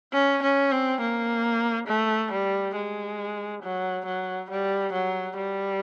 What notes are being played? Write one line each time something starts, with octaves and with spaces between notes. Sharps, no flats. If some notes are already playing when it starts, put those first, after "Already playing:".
C#4
C#4
C4
A#3
A3
G3
G#3
F#3
F#3
G3
F#3
G3